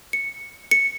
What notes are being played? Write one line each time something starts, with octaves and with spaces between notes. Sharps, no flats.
C#7
C#7